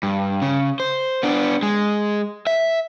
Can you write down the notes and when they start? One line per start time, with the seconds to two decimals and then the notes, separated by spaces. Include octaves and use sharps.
0.03 G2
0.42 C#3
0.80 C5
1.23 B3 D4
1.63 G#3
2.47 E5